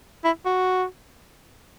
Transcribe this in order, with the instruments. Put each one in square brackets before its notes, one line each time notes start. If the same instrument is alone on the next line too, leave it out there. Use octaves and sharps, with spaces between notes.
[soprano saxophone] E4
F#4